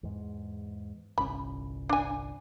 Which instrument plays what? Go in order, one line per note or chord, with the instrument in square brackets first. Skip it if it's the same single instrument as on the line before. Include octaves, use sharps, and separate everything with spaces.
[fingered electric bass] E2 G#2
[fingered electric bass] G1 C2 C#4 [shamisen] B5
[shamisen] D4 G#5